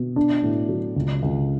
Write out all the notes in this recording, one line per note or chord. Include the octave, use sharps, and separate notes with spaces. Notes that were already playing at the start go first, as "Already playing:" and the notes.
Already playing: B2
D4
A2
F#3
C#2
C#2